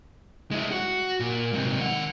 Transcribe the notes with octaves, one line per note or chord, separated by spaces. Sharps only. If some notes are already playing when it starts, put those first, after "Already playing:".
G#3 E4
F#4
A#2
G#2 C3
D#3 F#5